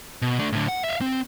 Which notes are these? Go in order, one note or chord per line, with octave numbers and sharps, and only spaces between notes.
B2
A3 D4
A2 D3
F#5
E5 F5
C4